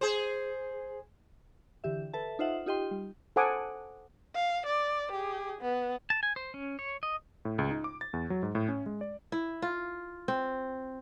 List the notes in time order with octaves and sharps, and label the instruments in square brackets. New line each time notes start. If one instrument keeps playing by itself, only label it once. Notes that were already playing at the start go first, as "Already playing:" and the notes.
[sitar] G#4 C5
[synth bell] D3 E3 G4 E5
A4 B4 E5 A5
D#4 F4 C5 E5 F#5
D#4 F4 G4 D#5 G5 C6
G3
[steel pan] A4 C5 F#5 G#5 D6 D#6
[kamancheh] F5
D5
G4 G#4
B3
[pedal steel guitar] A5
G#5
C5
C#4
C#5
D#5
[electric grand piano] A2
C#2
D#4
D6
A6
E2
F#3
G#2
A2
C#4
G#3
D5
[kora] E4
F4
C4